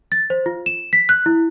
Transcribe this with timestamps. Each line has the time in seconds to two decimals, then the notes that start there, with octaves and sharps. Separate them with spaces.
0.12 A6
0.30 C5
0.46 F4
0.66 E7
0.93 B6
1.09 F#6
1.26 E4